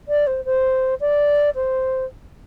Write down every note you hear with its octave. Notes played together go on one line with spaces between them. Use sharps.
D5
C5
C5
D5
C5